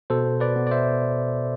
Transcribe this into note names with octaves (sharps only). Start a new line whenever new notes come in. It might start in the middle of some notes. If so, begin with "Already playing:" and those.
B2 A4 C5
B4 D5
B3
D5
C5 E5